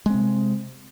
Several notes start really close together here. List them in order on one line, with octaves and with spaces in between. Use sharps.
G#3 C4 C3